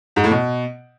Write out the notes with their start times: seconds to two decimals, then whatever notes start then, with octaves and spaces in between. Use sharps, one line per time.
0.16 G#2
0.24 A2
0.31 B2